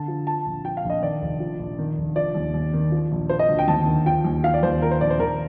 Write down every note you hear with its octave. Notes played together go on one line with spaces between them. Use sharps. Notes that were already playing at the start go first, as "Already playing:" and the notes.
Already playing: D3 A5
F3
F3 A5
A#1
F3 G5
F5
A#1
D#5
D#3 D5
F1
F3
A#1
D#3
F1
F3 D5
D#2
D#2
D#3
F3
A#1
F3 C5
D#5
D2
G5
D#2 A5
D#3
F3 G5
D#2
F3 F5
D5
D#2 C5
F3 A#4
C5
A#1 D5
C5
D#3 A#4